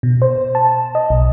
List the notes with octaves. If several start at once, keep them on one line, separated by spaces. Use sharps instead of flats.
B2
C5
A5
D#5
B1